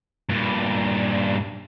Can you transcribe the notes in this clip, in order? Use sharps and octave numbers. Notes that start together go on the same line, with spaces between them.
G2 A#2